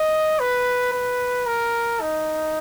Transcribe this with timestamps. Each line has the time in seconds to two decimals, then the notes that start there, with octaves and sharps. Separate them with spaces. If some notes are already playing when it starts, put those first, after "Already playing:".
Already playing: D#5
0.39 B4
0.93 B4
1.46 A#4
2.01 D#4